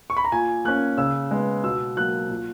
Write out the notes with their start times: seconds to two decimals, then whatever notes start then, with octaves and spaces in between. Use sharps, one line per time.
0.10 C#6
0.17 B5
0.24 A#5
0.32 A#2 G#5
0.65 A#3 C#4 F#6
0.98 C#3 E6
1.31 G#3 B3
1.64 B2 E6
1.97 F#3 A#3 F#6
2.29 A#2